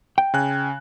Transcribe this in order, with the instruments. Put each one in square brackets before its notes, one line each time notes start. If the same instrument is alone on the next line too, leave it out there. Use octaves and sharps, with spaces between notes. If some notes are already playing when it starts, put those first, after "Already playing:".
[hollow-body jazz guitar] G5
[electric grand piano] C#3 G#5 F#6